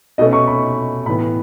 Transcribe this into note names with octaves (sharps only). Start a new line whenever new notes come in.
B2 A3 C#4 D#5
C#6
B5
A2 E3 B3 B5